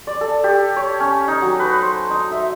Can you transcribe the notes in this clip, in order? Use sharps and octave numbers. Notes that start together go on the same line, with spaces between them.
D5
A4
G4
C#5
C#4
D#4
F#3
B4
C5
D#4
E5